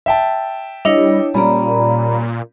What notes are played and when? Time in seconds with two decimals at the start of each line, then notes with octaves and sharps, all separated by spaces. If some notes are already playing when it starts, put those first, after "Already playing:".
0.06 E5 G5 A5
0.85 G3 D4 E4 C#5 D#5
1.34 A#2 G3 C#4 D5 A#5 B5